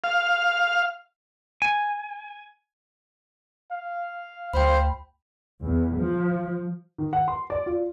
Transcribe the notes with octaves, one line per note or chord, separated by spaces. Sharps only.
F5
G#5
F5
D2 C5 G5 B5
E2
F3
D#3
F#5
C6
D5
F4